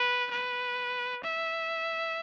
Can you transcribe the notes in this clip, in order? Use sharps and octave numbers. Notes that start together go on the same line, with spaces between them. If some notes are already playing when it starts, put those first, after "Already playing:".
Already playing: B4
B4
E5